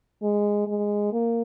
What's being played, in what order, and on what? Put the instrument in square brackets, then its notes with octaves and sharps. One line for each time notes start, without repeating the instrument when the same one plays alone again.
[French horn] G#3
G#3
A#3